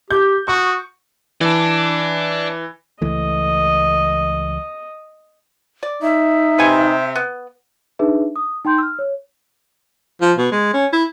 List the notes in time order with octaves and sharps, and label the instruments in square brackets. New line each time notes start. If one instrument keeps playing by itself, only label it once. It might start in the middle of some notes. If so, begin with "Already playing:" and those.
[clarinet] G4 [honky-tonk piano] G6
[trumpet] F#4 [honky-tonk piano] C#6 [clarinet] D#6
[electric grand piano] E3 [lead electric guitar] D5 A5
[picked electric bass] C#2 E3 A3 [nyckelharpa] D#5
[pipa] D5
[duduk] D#4 [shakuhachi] E5
[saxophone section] C3 [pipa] B4 G#5
[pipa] B3
[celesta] D4 D#4 G#4 B4 E5
D#6
D#4 G5 C6 G6
E6 F6
C#5
[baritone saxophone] F3
B2
G#3
C#4
E4